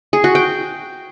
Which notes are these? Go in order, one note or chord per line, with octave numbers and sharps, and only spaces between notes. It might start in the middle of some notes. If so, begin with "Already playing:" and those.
G#4
F#4
G5